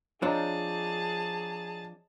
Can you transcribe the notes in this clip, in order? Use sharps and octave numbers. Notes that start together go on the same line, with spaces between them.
F3 C4 D4 G#4 C#5 D#5 A5 A#5